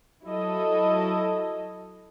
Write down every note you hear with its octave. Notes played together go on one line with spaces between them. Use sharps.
F#3 E4 A4 D#5